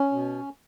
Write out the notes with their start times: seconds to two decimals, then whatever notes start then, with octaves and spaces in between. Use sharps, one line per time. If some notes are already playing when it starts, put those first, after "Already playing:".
Already playing: C#4
0.12 B2